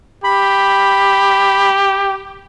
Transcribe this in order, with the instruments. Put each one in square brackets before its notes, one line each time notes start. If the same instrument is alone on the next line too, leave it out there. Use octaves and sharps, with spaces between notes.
[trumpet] G4 [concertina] B5